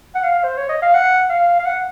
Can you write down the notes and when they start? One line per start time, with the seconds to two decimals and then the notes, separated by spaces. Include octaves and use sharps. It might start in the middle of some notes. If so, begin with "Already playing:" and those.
0.15 F#5
0.23 F5
0.43 C5
0.57 C#5
0.69 D#5
0.82 F5
0.94 F#5
1.30 F5
1.59 F5
1.66 F#5